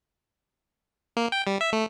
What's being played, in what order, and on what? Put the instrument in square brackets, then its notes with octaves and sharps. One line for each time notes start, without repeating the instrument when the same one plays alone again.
[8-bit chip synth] A#3
G5
G3
E5
A3